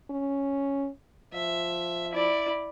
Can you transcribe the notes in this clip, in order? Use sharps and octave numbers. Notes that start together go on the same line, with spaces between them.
C#4
F3 E5
E4 D5